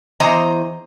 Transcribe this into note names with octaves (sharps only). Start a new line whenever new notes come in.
E2 C5 D#5 A#5